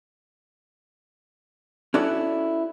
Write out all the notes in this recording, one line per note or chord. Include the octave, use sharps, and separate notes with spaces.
C#4 E4 F#4 A4 D5